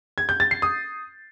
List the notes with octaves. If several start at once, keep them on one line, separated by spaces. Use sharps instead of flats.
G#6
G6
A6
C7
D#6